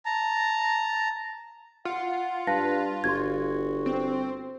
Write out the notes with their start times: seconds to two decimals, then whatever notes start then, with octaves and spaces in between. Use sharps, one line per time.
0.05 A5 A#5
1.85 F4 F#5
2.47 G2 B4 F5 A5 A#6
3.04 G1 F#4 C6 G#6
3.86 C4